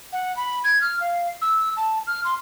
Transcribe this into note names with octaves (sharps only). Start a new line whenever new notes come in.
F#5
B5
G#6
F6
F5
E6
A5
F6
C6